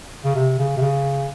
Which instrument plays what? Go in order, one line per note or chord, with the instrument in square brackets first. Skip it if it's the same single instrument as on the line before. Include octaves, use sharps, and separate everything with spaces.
[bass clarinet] C#3
C3
C#3
C3
C#3